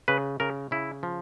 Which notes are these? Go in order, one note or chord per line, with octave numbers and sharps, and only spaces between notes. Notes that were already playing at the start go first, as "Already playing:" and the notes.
C#3 B4
C#3 A#4
C#3 E4
F3